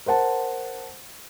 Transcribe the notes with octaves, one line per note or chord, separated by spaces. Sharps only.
A#4 C5 F#5 A5